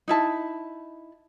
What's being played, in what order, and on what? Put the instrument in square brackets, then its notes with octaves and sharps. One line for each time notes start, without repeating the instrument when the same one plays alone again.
[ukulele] D#4 E4 A5